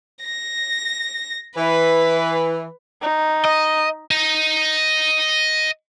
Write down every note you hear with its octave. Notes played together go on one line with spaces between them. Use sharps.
A#6
E3 B4
D#4
D#5
D#5 A#5